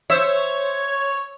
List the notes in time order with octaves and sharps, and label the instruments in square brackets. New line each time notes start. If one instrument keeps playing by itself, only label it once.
[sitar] C5 E5 [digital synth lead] C#5